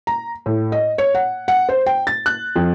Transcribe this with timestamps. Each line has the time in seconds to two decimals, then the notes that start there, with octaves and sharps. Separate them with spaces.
0.07 A#5
0.46 A2
0.72 D#5
0.98 C#5
1.15 F#5
1.48 F#5
1.69 C5
1.86 G5
2.07 A6
2.26 F#6
2.56 F2